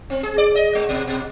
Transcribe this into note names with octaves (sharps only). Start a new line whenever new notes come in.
C4
G#4
D5
D#5
G#3
B2
B2